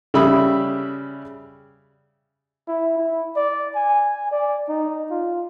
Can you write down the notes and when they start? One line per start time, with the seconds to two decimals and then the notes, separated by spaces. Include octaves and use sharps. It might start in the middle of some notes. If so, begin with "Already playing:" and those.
0.14 C#3 G3 E5 B5 D#6 E6
2.68 E4
2.98 E4
3.36 D5
3.76 G#5
4.32 D5
4.69 D#4
5.11 F4